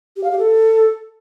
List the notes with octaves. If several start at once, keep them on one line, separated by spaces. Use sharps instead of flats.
G4
F5
G4
A4